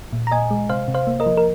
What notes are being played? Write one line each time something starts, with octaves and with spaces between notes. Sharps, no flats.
A#2
A#5
A#2 D#5 G#5
G#3
C3 C5 F5
C3
C5 F5
A#3
A#4 D#5
F3
A#4